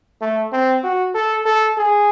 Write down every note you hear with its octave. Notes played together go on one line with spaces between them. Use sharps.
A3
C4
F#4
A4
A4
G#4